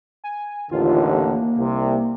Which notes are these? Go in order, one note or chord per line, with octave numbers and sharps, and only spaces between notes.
G#5
A1 D#2 D3 F4
A#3
C2 C3